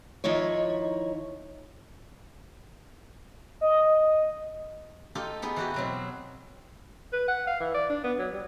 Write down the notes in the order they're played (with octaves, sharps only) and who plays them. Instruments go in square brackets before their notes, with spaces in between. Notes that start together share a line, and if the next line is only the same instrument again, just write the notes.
[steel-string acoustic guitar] D#3 F3 D#4 E4 C#5
[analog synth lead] D#5
[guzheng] D#4 F4 G4 A4
B3 D#4 G#4
E3 F#4 G4
B2 F#3 C4
[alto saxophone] B4
F#5
F5
E3
D5
D4
B3
F#3
G3